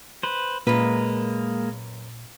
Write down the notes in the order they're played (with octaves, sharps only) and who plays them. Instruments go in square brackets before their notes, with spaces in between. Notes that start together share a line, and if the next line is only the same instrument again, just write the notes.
[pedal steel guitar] B4 C5
[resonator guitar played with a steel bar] F#2 B4 [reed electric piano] A#2 [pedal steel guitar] G#3 A#3